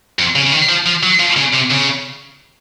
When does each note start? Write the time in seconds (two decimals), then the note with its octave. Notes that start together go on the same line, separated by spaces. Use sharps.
0.19 F2
0.35 C#3
0.46 C#3
0.52 D#3
0.69 F3
0.86 F3
1.03 F#3
1.19 F3
1.37 C#3
1.53 C3
1.70 C#3